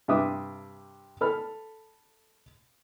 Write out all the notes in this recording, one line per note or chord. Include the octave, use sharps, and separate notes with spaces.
G2 C3 E5 D6 D#6
A4 B5 F6